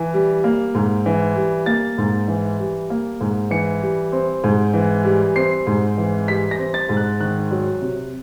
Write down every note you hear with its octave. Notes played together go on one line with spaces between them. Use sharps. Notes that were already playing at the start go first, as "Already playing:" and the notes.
Already playing: E3
G3
A#3
G#2
E3
G3
A#3 A6
G#2
E3
G3
A#3
G#2
E3 C#7
G3
C4
G#2
E3
G3
C4 C7
G#2
E3
G3 B6
A#6
C4
A6
G#2
F#6
D#3 F#6
F#3
C3